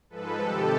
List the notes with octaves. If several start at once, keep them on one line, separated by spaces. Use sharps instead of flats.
G#2 F3 G#3 A4 B4
C3 D#3 G3 G4 A4